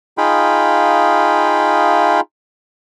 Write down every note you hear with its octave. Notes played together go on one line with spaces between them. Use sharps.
D#4 F4 G#4 F5 G5 B5